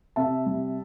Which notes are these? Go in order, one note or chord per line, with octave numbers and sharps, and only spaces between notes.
C3 E5 A5
G3